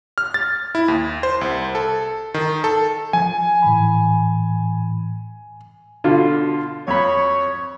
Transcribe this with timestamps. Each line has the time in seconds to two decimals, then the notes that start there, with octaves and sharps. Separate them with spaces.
0.18 F6
0.34 A6
0.75 E4
0.88 D#2
1.23 C5
1.41 C2
1.75 A4
2.34 D#3
2.64 A4
3.13 F3 G#5
3.62 A2 E3 B5
6.04 B2 D3 F4
6.88 F2 C#5 B5